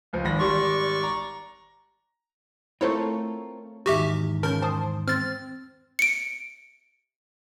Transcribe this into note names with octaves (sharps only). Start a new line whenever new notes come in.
C#2 F3
G#1 B5 A#6
G#1 G3 D5 C6 C#6
A#5
A3 C4 E4 F4 A4 A#4 C5 C#5
E2 G#2 D#3 F#4 G4 E5
C#3 A#4 A5 G6
C5 A5 D#6
C4 F6 A6
C#7 D7